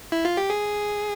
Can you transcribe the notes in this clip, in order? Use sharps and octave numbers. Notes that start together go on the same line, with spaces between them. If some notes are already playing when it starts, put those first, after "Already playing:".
E4
F4
G4
G#4